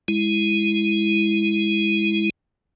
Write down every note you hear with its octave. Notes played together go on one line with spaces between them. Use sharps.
G#3 E4